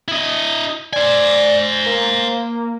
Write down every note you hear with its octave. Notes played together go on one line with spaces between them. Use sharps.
E4 D#5
C5 D5 G#5
A#3